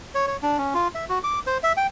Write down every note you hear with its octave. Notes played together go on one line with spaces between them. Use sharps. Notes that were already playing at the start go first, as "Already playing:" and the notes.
C#5
C#5
D4
C#4
F4
E5
F#4
D6
C5
E5
G5